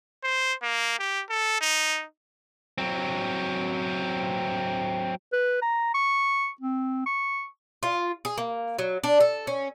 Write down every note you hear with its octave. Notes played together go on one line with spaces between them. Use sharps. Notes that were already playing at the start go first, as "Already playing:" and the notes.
C5
A#3
G4
A4
D#4
F#3 C4
B4
A#5
C#6
C4
C#6
F4
G#4
A#3
F#3
D4
A4
C#4